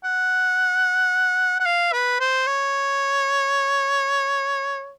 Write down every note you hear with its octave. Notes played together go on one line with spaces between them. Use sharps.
F#5
F#5
F5
B4
C5
C#5